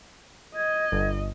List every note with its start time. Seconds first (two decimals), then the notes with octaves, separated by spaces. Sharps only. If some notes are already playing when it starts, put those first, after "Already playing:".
0.56 D#5 G#6
0.92 G1